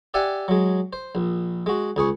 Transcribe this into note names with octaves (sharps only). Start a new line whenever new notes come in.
G4 D5 E5 F#5 G#5
F#3 G#3
C5
A#1
G#3 F#4
C#2 G#4 C#6